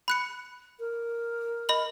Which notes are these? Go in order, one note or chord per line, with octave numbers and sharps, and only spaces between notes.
B5 F#6 C#7
A#4
D#5 B5 F#7